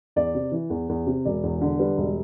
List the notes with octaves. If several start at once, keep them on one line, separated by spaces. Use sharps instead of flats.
E2 D5
C3
E3
E2
E2
C3
E1 D5
E2
D3
G3 B4
E1